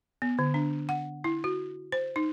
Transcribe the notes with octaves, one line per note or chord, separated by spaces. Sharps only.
B3
D3
D4
F#5
E4
F#4
C5
D#4